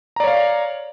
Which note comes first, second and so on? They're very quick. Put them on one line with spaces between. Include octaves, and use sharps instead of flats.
A#5 D5 C#5 F5